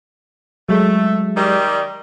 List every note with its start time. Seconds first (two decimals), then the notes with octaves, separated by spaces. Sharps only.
0.69 F#3 G#3 A3
1.36 D#3 G3